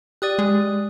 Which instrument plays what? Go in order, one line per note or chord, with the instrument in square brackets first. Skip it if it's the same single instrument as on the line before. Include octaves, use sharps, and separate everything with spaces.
[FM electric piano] G4 [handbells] D5 D#6 F#6
[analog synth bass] G#3